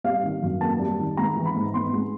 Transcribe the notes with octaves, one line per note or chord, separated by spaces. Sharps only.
G3 F5
D#3
F#2
A#3 A5
G3
D#3
G#3 A#5
E3
B5
G#2
B3 C6
G#3